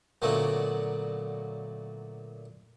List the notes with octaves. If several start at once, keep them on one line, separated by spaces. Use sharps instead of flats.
A#2 D3 F#3 A3 B3